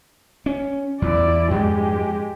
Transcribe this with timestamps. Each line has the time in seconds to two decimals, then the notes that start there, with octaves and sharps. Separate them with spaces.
0.46 C#4
1.02 E2 E4 D5
1.51 F2 G#2 G#3 G4